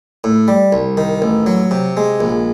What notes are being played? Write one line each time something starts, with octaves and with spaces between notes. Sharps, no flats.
A2
G3
C2
D#3
A1
F#3
C3
G#3
A#1